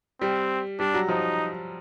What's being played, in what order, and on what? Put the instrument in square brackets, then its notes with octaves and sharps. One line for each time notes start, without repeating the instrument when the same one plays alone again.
[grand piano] G3 [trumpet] C4
[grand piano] G3 [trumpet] D4
[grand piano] F#3
[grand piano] F3 [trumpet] D#4